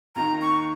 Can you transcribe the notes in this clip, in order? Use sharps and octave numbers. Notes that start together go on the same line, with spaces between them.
D#2 D#3 A#3 D#4 A#5
C#6